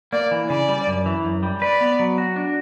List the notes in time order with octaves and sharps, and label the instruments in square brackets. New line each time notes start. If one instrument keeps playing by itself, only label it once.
[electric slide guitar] A#3 [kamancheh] D5
[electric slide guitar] E3
[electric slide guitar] C#3 [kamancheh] D5
[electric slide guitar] G3
F#2
E3
F#2
G3
[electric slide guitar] B4 [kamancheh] D5
[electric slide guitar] B3
F#3
F#4
D4